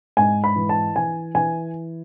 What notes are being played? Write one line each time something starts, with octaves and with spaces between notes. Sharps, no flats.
G#2 G#5
B5
E3
A5
E3 G#5
E3 G#5